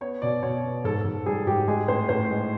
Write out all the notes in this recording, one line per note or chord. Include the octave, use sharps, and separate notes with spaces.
B3 C#5
B2 D5
B2 C#5
B3
G#2 A4
G#2
G3 G#4
G#2 G4
G#3 G#4
A2 C5
A2 C5
G#3